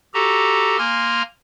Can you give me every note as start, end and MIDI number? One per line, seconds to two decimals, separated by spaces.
0.14 0.78 66
0.14 0.78 67
0.14 0.78 69
0.14 0.78 82
0.78 1.23 58
0.78 1.23 80
0.78 1.23 82
0.78 1.23 84
0.78 1.23 89